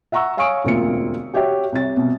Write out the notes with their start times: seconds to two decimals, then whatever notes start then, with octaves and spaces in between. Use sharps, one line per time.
0.12 E5 F#5 A#5 C#6 E6
0.37 C#5 F5 G#5 C#6 D#6 D7
0.64 E1 D2 A#3 C4 F4 C#7
1.34 F#4 G4 C#5 E5 G5
1.72 C2 C3 C#5 A6
1.97 C2 B2